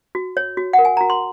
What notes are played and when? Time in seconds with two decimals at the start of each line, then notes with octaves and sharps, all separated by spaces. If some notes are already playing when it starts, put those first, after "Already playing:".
0.15 F#4
0.37 C#5
0.57 F#4
0.73 F#5
0.79 A#4
0.85 G#5
0.97 F#4 A#5
1.10 C6